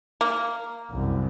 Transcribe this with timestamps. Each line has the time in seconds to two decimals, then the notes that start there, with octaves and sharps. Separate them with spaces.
0.21 A#3
0.90 C2 F#2